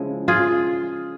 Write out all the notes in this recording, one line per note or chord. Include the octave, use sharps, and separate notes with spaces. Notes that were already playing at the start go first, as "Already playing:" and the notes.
Already playing: C#3 F3 G#3 E4
F4 G#4